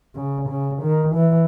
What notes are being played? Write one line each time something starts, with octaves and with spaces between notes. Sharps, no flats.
C#3
C#3
D#3
E3